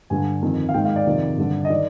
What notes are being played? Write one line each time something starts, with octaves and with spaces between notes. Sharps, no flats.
G2 D3 G#5
F2 D#3
F5
G#2 D#3 G5
F5
D5
F2 C3 D#3
G2 D3
D#5
D#3 D5